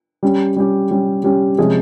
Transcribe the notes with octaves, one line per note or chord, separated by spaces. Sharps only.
G3 C#4 G4
G3 C#4 G4
G3 C#4 G4
G3 C#4 G4
C3 F3 G#3 C#4 G#4